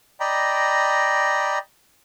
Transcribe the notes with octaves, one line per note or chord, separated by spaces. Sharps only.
D5 D#5 G5 A#5 B5